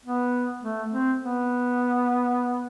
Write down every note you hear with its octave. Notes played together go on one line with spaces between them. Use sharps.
B3
A3
C4
B3